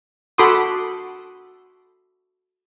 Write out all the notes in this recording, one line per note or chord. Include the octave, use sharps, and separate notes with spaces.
F#4 A4 B5 C6 D6 D#6